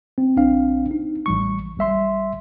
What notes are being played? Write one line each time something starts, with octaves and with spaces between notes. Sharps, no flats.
C4
A#1 C4 D4 F5
D#4
A1 G3 C#6
A1 G3 E5 C6